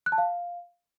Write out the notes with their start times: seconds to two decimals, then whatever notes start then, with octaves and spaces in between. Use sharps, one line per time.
0.06 F#6
0.12 A5
0.18 F5